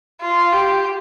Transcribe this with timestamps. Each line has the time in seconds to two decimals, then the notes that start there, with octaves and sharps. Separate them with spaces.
0.21 F4
0.52 G4